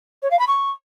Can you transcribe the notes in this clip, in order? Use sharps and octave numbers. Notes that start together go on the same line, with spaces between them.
C#5
F5
B5
C#6